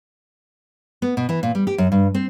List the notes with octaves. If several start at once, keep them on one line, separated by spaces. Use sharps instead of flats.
B3
B2
E3
A#2
G3
G4
F#2
G2
C4